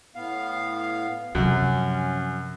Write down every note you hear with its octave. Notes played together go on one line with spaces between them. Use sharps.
A2 B3 F5
F#2 C3 F3 C#4